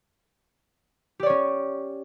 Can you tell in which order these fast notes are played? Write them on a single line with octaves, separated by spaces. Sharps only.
G4 D5 C#5 C#4